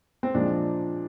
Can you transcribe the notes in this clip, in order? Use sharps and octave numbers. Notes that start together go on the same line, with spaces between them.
C4
A#2 F3 G#3 D4